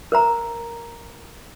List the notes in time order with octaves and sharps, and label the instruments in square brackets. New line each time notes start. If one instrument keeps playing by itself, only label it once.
[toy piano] A#4 C5 A#5